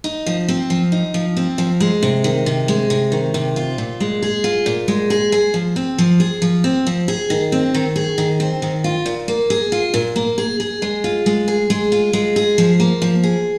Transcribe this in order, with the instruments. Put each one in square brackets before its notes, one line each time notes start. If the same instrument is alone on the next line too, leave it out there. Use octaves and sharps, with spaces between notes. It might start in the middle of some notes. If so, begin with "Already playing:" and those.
[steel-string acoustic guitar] D#4
F3
C4
F3
D#4
F3
C4
F3
G#3
C3
D#3
C3
G#3
C3
D#3
C3
F4
A#2
G#3
G#4
F4
A#2
G#3
G#4
G#4
F3
C4
F3
G#4
F3
C4
F3
G#4
D#3
C4
D#3
G#4
D#3
C4
D#3
F4
A#2
A#3
G#4
F4
A#2
A#3
G#4
G#4
G#3
F4
G#3
G#4
G#3
F4
G#3
G#4
F3
A#3
F3
G#4